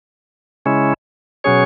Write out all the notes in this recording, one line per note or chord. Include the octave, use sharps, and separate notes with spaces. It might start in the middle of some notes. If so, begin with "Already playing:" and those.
C#3 G#3 C#4 E4
B2 F#3 C#4 G#4 C#5